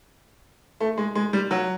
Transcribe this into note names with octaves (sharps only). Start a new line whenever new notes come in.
A3
G#3
G#3
G3
F#3